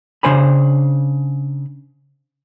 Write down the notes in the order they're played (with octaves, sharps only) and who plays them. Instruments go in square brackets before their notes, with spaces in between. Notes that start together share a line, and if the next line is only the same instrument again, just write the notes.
[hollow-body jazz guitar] C#3 D4 C5 G#5 B5